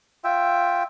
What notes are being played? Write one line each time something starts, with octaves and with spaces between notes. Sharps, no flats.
F4 E5 G5